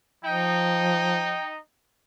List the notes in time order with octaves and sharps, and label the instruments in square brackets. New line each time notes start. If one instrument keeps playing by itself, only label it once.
[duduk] F3 [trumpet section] D#4 [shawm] G5